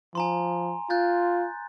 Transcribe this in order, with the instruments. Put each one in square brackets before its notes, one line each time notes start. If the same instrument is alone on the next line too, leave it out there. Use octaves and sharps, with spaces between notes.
[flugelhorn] F3 [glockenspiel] G#5 A#5 C6
[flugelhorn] F4 [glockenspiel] F#6 G6 A6